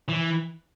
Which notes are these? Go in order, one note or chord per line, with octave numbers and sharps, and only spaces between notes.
E3